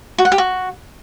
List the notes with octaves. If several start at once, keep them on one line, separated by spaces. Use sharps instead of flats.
F#4
F#5
G4
F#4